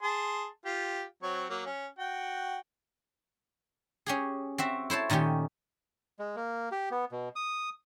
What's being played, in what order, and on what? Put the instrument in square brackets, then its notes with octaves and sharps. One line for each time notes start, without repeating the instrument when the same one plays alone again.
[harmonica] G#4 A5 C6
F4 G4
F#3 C4 C#5
F#3 A#3
C#4
F#4 G5
[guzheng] C#4 G4 G#4
C4 F#4 E5
E4 C5 C#5 A5
A#2 D#3 A3 C#4 G4
[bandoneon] G#3
A#3
G4
B3
B2
D#6